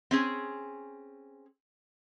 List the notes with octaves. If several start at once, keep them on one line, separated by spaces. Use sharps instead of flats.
C4 C#4 G#4